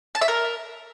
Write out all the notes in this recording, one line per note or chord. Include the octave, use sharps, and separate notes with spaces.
A5
E5
A#4